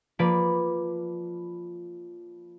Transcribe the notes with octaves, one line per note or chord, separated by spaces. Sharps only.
F3 A#3 B4 D5